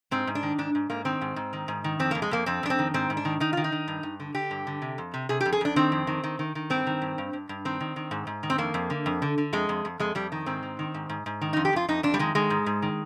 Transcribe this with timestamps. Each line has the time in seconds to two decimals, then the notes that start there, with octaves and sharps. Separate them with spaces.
0.11 G#2 C4
0.27 G#2
0.35 D4
0.43 D#3
0.58 G#2 D4
0.75 G#2
0.90 G#2 A#3
1.05 D#3 C4
1.21 G#2
1.36 G#2
1.53 D#3
1.68 G#2
1.84 D#3
1.99 F2 C4
2.11 F2 A#3
2.22 G#3
2.31 F2 A#3
2.46 F2 C4
2.63 F2 D4
2.70 C4
2.79 D#3
2.94 G#2 C4
3.10 G#2
3.17 D4
3.25 D#3
3.40 D#3 D#4
3.53 D#3 F4
3.64 D#4
3.72 D#3
3.88 G2
4.03 G2
4.20 D3
4.34 D3 G4
4.51 G2
4.67 D3
4.82 C3
4.98 F2
5.14 C3
5.29 C3 G#4
5.41 G4
5.45 F2
5.52 G#4
5.61 F2 D4
5.76 D#3 C4
5.92 F2
6.07 D#3
6.24 D#3
6.39 D#3
6.55 D#3
6.70 G2 C4
6.87 D#3
7.02 G2
7.18 G2
7.33 G2
7.49 G2
7.65 D#3 C4
7.80 D#3
7.96 D#3
8.11 G#2
8.27 G#2
8.43 D#3
8.50 C4
8.58 F2 A#3
8.74 F2
8.90 D3
9.06 F2
9.22 D3
9.38 D3
9.53 F2 G#3
9.69 F2
9.85 F2
9.99 F2 G#3
10.15 F2 G3
10.32 D#3
10.46 G#2 C4
10.63 D#3
10.79 D#3
10.94 G#2
11.09 G#2
11.26 G#2
11.41 D#3
11.53 D#4
11.57 F2
11.65 G4
11.73 F2 F4
11.88 F2 D#4
12.03 F2 D4
12.14 G3
12.19 D#3 G#3
12.35 D#3 G#3
12.50 G#2
12.66 G#2
12.82 D#3